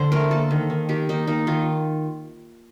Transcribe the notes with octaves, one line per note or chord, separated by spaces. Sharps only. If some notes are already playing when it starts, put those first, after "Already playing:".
Already playing: D3 C5
A3 A#4
A#3 A4
D#3
D#3
D#3 G4
A#3 D#4
A#3 D#4
D#3 F4